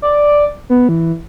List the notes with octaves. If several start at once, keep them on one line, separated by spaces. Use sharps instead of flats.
D5
B3
E3